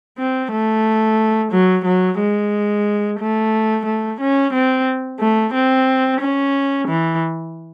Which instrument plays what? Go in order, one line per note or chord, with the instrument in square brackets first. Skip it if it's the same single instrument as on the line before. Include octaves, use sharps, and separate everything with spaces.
[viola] C4
A3
F#3
F#3
G#3
A3
A3
C#4
C4
A3
C4
C#4
E3